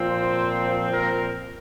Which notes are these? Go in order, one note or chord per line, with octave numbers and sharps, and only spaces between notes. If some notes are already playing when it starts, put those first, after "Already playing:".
Already playing: A#2 F3 C4
C5
A#4